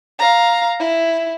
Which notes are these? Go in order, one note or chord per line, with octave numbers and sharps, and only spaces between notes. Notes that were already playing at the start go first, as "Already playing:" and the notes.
F5 A#5
E4